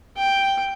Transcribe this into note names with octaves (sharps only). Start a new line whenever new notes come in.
G5